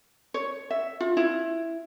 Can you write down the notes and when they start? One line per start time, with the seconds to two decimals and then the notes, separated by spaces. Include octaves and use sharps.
0.34 C#5
0.70 E5
1.00 F4
1.17 E4